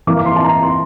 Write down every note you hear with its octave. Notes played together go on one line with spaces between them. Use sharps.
E3 A#3 D6
D6
C6
A5
A#5
C6